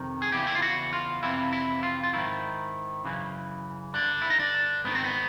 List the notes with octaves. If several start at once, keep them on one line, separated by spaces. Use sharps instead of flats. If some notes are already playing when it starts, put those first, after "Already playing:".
Already playing: F2 C3 D#3
G#4
E2 C#3 E3 G4
E4
F4
F#4
F4
F2 C3 E3 E4
E4
F4
F4
G#2 D#3 E4
F#2 C#3 E3
G2 D3 D4
E4
D#4
D4
G#2 D#3 B3
C4
B3